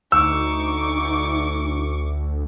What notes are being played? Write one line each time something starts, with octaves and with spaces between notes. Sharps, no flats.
D2 D#4 C#6 D6 E6